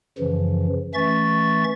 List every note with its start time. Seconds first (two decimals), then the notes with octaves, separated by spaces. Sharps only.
0.18 F#2 C#3 E3 F3
0.94 E3 A3 C#4 E5 C#6 A6